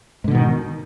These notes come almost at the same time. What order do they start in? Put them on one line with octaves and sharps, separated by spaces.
G#2 D3 B2 D#3